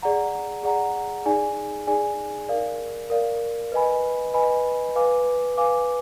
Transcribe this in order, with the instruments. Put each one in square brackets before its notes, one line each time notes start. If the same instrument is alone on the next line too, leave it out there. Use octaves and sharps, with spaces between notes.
[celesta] G#4 D5 F#5 A#5
G#4 D5 F#5 A#5
D#4 G#4 D5 G#5
D#4 G#4 D5 G#5
A#4 D5 F5
A#4 D5 F5
B4 D#5 G#5 B5
B4 D#5 G#5 B5
B4 F5 G#5 D6
B4 F5 G#5 D6